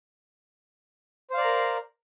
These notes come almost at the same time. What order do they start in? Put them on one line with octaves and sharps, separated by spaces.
C5 F5 D5 A#5 A#4